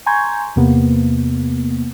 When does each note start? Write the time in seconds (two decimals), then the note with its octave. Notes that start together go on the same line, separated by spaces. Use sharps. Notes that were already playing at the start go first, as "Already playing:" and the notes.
0.06 G#5 A#5 C6 C#6 G6 G#6
0.56 E2 C3 A#3 B3